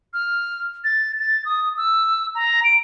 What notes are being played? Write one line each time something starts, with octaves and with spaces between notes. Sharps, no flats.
F6
A6
A6
D#6
E6
A#5
D7